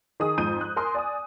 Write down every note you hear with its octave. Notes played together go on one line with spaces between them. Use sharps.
D#3 G#4 D#6
F2 G#2 G6 D#7
F#6
A#4 G#5 C6 D#6
D5 G#5 D#6